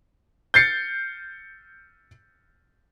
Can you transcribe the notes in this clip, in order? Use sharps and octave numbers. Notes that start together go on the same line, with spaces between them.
G6 A6 C7 C#7